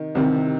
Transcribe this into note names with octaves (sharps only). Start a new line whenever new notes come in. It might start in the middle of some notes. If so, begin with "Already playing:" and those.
Already playing: C3 D#3
C2 C3 D#3